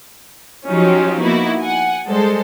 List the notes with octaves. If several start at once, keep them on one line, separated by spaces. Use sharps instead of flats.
F3 F#3 C#4 D#4 F4 G4
A#3 B3 D#4 E4 F#4
F#5 G#5
G3 G#3 A4 C5